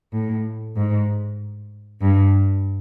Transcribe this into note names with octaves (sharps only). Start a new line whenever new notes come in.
A2
G#2
G2